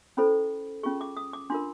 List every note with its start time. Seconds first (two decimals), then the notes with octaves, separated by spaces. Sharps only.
0.17 C#4 E4 A4 C5 B5
0.83 C#4 F4 G#4 C#6
1.01 D6
1.17 D#6
1.33 D6
1.50 D4 F4 A#4 C6